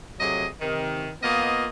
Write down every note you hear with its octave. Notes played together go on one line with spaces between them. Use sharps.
C3 F#3 A3 G#4 D#5
C3 D#3
A#3 B3 F4 D#5